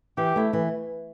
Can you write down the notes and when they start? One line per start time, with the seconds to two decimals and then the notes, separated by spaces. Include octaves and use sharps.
0.17 E3 G4
0.36 A3 E4
0.53 E3